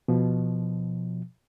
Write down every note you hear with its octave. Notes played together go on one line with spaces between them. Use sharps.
B2 F3